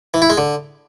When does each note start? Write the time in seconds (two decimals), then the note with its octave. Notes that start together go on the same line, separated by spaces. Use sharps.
0.14 E3
0.22 E4
0.30 G#3
0.38 D3